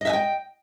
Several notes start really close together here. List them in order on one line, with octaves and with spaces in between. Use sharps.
D#5 E5 G#5 G5